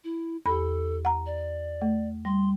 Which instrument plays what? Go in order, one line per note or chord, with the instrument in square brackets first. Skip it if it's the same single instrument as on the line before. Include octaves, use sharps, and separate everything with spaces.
[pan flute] E4
[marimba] E2 G4 [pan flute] A4 [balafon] B5
[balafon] F#5 A#5
[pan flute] D5
[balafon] A3
[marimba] G3 [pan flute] C6